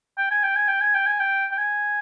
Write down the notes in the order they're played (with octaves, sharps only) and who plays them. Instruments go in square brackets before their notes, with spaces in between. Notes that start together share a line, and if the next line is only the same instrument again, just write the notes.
[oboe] G5
G#5
G5
G#5
G5
G#5
G5
G#5
G5
G5
G#5